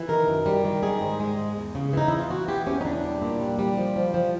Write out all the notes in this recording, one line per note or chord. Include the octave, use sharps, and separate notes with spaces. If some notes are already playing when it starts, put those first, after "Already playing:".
Already playing: E3
D#3 A#4
F#2
G3
D#3
D#3 G#4
G#2
G#3
G#2
E2
C#3
E3 D#4
E2 E4
F4
E3 F#4
E3 G4
E2 C#4
D#4
E2 D4
G3
A#2
G3
G3
F3
F3
F3